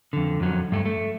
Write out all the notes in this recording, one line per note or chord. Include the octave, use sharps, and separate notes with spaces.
F2 D3
F2 F#3
G2 A3
A3